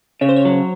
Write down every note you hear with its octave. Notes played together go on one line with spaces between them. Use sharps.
C#3 C#5
C5
C#5
F#3